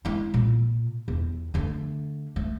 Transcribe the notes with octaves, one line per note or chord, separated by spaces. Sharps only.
G#3 E4
A#2
E2
D3 A3
A3